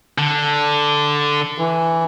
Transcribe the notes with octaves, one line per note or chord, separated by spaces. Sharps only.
D3
E3